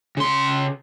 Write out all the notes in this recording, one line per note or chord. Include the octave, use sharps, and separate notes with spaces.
C#3 C6